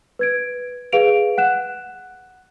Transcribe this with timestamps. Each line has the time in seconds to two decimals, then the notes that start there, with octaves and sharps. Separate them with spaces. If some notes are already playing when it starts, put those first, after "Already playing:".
0.19 B4 G#6 D7
0.93 G#4 B4 F5 D7 F7
1.38 F#5 F#6 E7